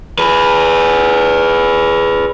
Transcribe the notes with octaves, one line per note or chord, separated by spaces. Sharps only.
G#4 B4